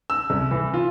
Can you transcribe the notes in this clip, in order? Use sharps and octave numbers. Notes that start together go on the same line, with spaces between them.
E6
C2
E3
F4